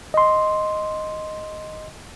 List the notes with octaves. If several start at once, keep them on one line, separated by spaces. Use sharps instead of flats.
D#5 C6